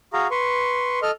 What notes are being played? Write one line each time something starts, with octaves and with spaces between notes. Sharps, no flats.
F#4 G#4 F5 A#5
B4 C6 C#6
A4 D#5 F6